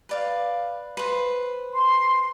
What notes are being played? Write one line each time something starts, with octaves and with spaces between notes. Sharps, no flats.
B4 D5 F5
B4 C5
C6